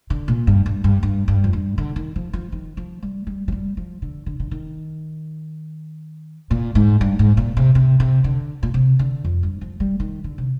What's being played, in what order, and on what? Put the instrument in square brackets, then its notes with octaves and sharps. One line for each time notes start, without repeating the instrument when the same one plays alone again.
[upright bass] D3
A#2
G2
G2
G2
G2
G2
F2
G2
D3
D#3
F3
F3
D#3
F3
G3
G3
F3
G3
F3
D3
D3
D3
D#3
A#2
G#2
G2
G#2
A#2
C3
C3
C3
D3
A#2
C3
D3
F2
G2
F3
G3
D#3
D3
C3